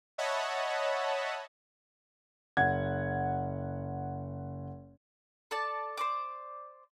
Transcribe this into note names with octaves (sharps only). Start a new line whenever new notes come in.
C#5 D#5 E5 F#5 A5 B5
F#1 F#5 G#6
A4 D5 A5
C5 D5 D6